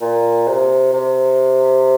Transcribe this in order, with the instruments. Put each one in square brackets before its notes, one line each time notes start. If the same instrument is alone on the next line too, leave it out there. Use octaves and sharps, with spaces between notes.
[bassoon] A#2
C3
C3